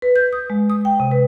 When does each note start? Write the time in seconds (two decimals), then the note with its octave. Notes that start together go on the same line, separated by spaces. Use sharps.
0.02 B4
0.16 G6
0.33 D#6
0.50 G#3
0.70 D#6
0.85 G5
1.00 C3
1.11 B4